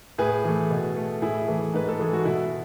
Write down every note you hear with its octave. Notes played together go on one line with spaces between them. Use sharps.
A2 G#4 B4
E3 A3
B2
A3
A2 E4 G#4
E3 A3
G#2 B4
A4
E3 G#3 G#4
F#4
B2 E4